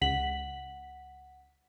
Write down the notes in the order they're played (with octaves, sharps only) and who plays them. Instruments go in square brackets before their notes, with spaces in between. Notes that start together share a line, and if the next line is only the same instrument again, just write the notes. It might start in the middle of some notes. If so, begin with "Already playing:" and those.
[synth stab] C#2 B6 [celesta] F#5 F#7